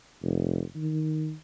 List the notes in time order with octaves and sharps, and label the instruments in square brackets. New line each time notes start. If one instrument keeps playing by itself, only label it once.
[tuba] F1
D#3